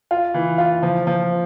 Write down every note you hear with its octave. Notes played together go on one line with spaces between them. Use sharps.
F4
E3
F4
F3
F3